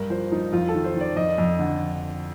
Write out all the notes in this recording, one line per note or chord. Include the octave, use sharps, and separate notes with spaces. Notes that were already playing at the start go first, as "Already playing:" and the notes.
Already playing: G2 A#4
F3 C5
F3 D#4
F2 F4
A4
D#3
C5
D#3
D5
F2 D#5
F2
D3